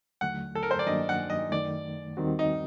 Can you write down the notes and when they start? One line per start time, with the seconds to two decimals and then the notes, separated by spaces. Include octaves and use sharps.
0.21 D#2 D3 F#3 A3 F#5
0.55 A4
0.63 A#4
0.71 C5
0.79 D5
0.87 G2 D#3 F#3 A#3 D4 D#5
1.09 F#5
1.30 D#5
1.52 F#2 D#3 A3 D5
2.17 D#2 D#3 G3 C4 F#4
2.39 D#4